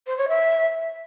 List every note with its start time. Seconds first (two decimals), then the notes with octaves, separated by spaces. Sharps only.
0.07 C5
0.17 C#5
0.28 E5